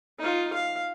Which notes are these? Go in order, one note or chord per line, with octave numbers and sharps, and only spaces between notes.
D#4 F4
F5